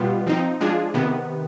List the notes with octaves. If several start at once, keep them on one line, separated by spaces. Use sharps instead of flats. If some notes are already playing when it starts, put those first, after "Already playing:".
Already playing: B2 G3 B3 F4
F3 C4 D#4
F3 G#3 D4 F4 G#4
C3 D#3 B3